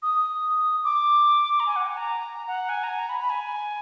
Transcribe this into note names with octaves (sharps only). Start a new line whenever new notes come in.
D#6
D6
A#5
G#5
F#5
G#5
A#5
F#5
G#5
A#5
G#5
A#5
B5
B5
G#5